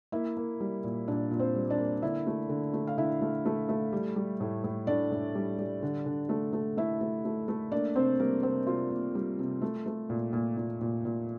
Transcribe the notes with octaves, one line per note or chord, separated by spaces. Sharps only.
A#3 E4 E5
A#3
G3
A#2
A#2 D4 D5
A#2
C4 C5
G3
D4 D5
A#3
D3 E4 E5
A3
D3
A3
F5
D3 E4 E5
A3
A3
A3
G3
G3
A2
A2
A2 D4 D5
A2
G3
G3
D3
D3
A3
A3
A3 E4 E5
A3
A3
A3
A#3 D4 D5
C3 C4 C5
G3 A#3 A#4
C3 C4 C5
C3 F4
A#3
G3
C3
A3
A3
A#2
A#2
A#2
A#2
A#2